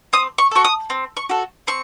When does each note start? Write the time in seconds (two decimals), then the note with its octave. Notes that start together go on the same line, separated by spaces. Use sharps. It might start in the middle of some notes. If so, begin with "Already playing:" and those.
0.13 C4 D#6
0.38 C#6
0.51 F#4 A4 C#6
0.64 D#6
0.90 C4
1.17 C#6
1.29 F#4 A4
1.67 C4 C#6